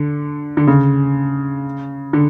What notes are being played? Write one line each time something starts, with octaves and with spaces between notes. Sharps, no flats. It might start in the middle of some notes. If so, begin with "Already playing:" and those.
Already playing: D3
D3
C#3
D3